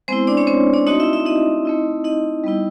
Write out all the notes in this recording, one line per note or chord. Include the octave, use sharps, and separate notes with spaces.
G#3 B3 C4 E4 C5
D4 D5
C#4 C#5
C4 C5
D4 D5
A3 C4 D#4 F#4 D#5
E4 E5
E4 E5
D#4 D#5
A3 C4 E4
D#4 D#5
G3 B3 E4